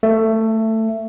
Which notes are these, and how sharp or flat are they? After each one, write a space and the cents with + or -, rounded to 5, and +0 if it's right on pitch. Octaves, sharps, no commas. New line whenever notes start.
A3 +15